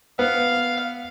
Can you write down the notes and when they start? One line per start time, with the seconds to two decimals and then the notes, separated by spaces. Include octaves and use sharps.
0.19 B3 F5